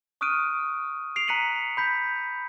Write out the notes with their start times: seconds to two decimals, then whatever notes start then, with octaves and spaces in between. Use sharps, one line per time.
0.21 C#6 D#6 F6 F#6 D7 D#7
1.16 C7 D7 F7
1.28 A#5 F#6 B6 C#7 D#7 F#7
1.77 B5 G6 B6